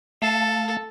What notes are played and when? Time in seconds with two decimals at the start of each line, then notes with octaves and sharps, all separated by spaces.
0.22 A3 A4 F5 A5